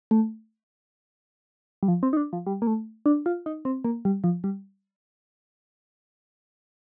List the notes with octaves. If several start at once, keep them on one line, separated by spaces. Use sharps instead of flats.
A3
G3
F3
C4
D#4
D4
F3
G3
A#3
A3
D4
F4
D#4
C4
A#3
G3
F3
G3